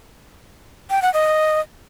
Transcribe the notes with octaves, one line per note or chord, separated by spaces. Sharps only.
G5
F#5
D#5